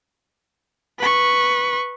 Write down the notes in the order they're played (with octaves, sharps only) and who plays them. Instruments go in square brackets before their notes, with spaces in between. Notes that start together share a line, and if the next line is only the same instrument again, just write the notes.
[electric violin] B4 C#6